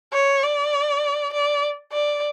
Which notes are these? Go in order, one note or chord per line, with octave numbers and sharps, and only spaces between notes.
C#5
D5
D5
D5